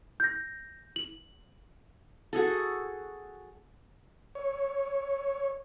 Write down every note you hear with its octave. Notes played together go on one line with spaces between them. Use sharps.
G6 A#6
F#7
F#4 G#4 A4
C#5